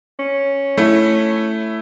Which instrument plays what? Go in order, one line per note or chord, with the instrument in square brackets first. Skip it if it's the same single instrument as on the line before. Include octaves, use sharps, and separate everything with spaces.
[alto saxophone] C#4
[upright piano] A3 E4